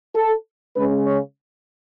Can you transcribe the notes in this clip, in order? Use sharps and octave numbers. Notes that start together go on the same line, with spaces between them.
A4
C#3 G#3 C#4 B4
C#5